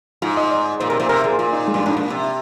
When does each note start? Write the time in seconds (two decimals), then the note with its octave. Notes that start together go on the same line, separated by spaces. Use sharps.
0.22 G#2 F4
0.37 D#5
0.51 D5
0.80 A#2 C5
0.89 C3 A#4
1.00 A#2 C5
1.09 C3 A#4
1.24 A#2 G#4
1.38 A#2 F4
1.53 D#4
1.68 G#3
1.74 G2 D4
1.86 G#2 D4
1.97 A#2
2.10 C3